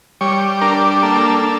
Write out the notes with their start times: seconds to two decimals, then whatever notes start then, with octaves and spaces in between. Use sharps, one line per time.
0.21 G3 C#5
0.61 D4 A#4
1.03 A#3 A4
1.43 D4